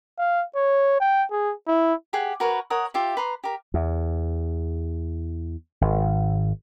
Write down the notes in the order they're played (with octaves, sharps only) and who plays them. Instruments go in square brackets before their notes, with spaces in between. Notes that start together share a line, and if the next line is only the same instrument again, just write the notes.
[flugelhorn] F5
C#5
G5
G#4
E4
[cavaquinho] G4 G#4 F#5
F#4 A#4 B4 C#5
A#4 C#5 F#5 D#6
F4 G4 E5
B4 A#5 C6
G4 A#4
[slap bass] E2
G#1